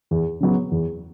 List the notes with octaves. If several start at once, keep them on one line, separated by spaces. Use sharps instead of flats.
E2
C#3 F#3 B3
E2